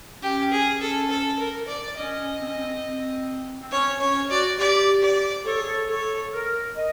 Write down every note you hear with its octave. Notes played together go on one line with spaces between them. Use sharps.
C#4 G4
G#4
A4
A4
A#4
D5
C#4 D#5
C4
C#4
C4
C4
C4
C#4 C#5
C#4 C#5
F#4 D5
G4 D5
D5
A4 C#5
G#4
A4
A4 C#5
A#4
D#5